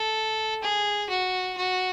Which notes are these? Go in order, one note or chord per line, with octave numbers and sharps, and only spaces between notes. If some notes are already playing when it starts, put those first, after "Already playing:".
Already playing: A4
G#4
F#4
F#4